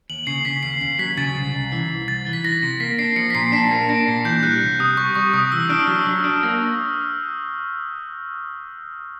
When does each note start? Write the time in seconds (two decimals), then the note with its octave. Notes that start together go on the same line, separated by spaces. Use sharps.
0.10 D#2 F#7
0.27 C#3 C7
0.45 C#3 B6
0.63 D#2 C7
0.81 D#2 C7
0.99 F#3 B6
1.17 C#3 A6
1.36 C2
1.54 C2
1.72 E3
1.90 C2
2.07 C2 A6
2.27 E3
2.33 B6
2.44 E3 A#6
2.62 C3
2.80 A#3 B6
2.98 D4 C7
3.16 F3 C#7
3.30 B6
3.35 A#2 C7
3.52 D4 B6
3.71 A#3
3.89 D4 A#6
4.08 A#2
4.25 E3 G6
4.43 G3 F#6
4.61 C2
4.79 C3 D#6
4.97 G3 C#6
5.15 G3 C#6
5.33 C3 D#6
5.52 E3 E6
5.69 D4 F6
5.88 F#3
6.07 F#3
6.24 D4
6.43 A#3